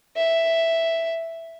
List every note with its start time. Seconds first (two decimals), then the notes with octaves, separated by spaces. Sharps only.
0.17 E5